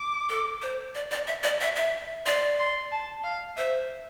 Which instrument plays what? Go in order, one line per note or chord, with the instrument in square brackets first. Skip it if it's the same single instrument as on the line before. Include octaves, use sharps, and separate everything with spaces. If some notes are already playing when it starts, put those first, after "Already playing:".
Already playing: [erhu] D6
[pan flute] A4
C5
D5
D5
E5
D5
E5
E5
[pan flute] D5 [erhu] C6
[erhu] C6
A5
F5
[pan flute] C5 [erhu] E5